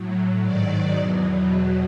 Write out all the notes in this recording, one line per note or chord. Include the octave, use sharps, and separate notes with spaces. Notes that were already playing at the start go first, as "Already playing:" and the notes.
Already playing: A2 F#3
G#2 D#3 F#3 D5
E2 B2 F#3
E2 B2 F#3